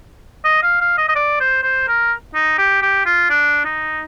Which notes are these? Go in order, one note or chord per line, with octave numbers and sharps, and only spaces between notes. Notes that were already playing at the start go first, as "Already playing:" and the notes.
D#5
F5
F5
D#5
D#5
D5
C5
C5
A#4
D#4
G4
G4
F4
D4
D#4